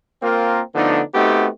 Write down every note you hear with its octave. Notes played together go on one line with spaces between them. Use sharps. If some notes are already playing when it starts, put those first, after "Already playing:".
A#3 C4 F4 A#4
D3 F3 A3 B3 D4 D#4
A3 B3 C4 D#4 F#4 G4